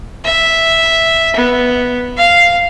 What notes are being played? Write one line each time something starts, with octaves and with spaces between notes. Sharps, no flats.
E5
B3
F5